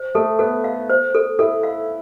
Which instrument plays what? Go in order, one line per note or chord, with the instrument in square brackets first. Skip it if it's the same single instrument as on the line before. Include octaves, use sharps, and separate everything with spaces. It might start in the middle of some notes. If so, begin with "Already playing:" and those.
Already playing: [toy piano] C5
[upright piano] A3 [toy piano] A4
[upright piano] B3 [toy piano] A4
[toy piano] F5
C5
A4
[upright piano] E4 [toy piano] A4
[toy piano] F5